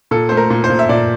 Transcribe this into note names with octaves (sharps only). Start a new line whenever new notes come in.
A#2 A4
A3 C5
A#4
A#2
C5
A#2
E5
A#2 D5